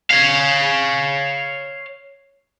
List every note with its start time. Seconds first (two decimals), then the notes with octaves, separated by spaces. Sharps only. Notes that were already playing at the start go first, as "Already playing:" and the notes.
0.11 C#5 F5